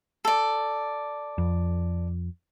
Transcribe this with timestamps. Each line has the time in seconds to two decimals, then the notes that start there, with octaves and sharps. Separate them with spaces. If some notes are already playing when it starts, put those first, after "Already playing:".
0.25 A4 D5
1.38 F2